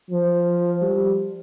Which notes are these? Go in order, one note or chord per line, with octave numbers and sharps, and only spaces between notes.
F3
G3